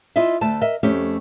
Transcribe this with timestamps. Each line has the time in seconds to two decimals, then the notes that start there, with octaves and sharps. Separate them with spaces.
0.16 E4 F4 D#5 E5
0.41 D2 A3 A5
0.61 A#4 D#5 E5
0.83 F2 A3 C#4 G4